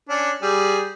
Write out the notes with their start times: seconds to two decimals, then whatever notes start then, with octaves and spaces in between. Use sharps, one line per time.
0.09 C#4 D4
0.42 G3 G#4